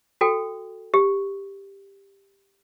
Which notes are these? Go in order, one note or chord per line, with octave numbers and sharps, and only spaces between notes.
F#4 A4 G5
G4